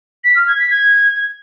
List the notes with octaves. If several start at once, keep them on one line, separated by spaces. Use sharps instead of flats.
B6
F6
G#6
B6
G#6